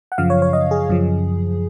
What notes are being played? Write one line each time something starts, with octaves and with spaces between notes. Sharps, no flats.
F#5
F#2 C#3 F3 F5
C#5
C#5
D#5
G#4
F#2 C#3 F3